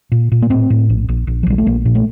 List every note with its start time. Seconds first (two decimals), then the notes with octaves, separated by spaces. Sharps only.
0.12 A#2
0.32 A#2
0.42 A#3
0.50 A2 C4
0.70 A2
0.90 A#1
1.09 A#1
1.27 A#1
1.43 F3
1.46 A#1 G3
1.58 A3
1.67 A#1 A#3
1.85 A#2
1.95 A3